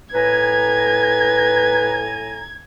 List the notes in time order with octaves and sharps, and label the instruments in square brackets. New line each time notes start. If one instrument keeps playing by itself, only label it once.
[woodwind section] A2 G#5 A#5 [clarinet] B4 [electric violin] G#6